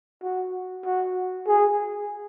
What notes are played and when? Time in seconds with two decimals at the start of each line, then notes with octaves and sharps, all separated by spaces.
0.23 F#4
0.85 F#4
1.47 G#4